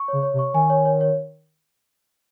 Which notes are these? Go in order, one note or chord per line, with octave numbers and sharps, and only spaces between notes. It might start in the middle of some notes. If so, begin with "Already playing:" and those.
Already playing: C#6
C#3 C#5
C#5
C3
C#6
D#3 G#5
C#5
C#5
C#5